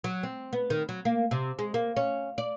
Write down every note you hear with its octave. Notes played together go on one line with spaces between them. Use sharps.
F#3
C4
B3
D#3
F#3
A#3
C3
G#3
A#3
C#4
D5